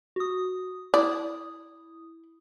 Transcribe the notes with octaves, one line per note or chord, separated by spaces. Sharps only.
F#4 D#6
E4 D5 D#6